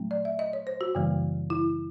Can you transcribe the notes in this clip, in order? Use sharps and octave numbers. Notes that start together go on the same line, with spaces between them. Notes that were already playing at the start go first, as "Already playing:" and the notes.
Already playing: A#2 F#3 A3 C4
D5
E5
D#5
C#5
C5
F#4
F#2 C#3 E3 G3 A#3
E4